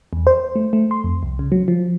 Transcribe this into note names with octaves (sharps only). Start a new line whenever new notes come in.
E2
C5
A3
A3
C6
F2
C2
C#3
F#3
F3